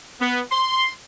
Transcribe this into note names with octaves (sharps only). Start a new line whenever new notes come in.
B3
C6